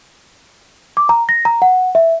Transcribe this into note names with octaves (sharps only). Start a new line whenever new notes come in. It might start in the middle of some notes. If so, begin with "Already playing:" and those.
D6
A#5
A#6
A#5
F#5
E5